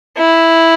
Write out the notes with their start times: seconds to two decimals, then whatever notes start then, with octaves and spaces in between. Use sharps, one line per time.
0.17 E4